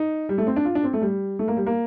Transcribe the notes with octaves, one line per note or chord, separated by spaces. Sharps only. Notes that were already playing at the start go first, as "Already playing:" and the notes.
Already playing: D#4
G3
A3
C4
D4
F4
D4
C4
A3
G3
A3
A#3
G3
A#3